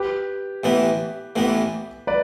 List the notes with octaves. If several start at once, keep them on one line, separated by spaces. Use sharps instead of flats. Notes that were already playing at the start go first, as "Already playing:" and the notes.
Already playing: G4 B4
A1 A2 E3 B3
A1 A2 E3 B3
B4 D5